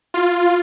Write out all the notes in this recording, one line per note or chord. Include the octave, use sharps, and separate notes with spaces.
F4